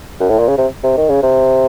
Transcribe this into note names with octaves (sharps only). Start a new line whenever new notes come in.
F#2
A2
A#2
C#3
C3
C3
D#3
C#3
C3